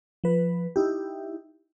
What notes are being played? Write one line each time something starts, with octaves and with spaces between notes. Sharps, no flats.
F3 B4
D#4 E4 G4